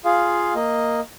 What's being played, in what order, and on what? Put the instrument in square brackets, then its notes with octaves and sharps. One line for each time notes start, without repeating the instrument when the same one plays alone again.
[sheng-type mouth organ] F4 G#4 F5
A#3 D#5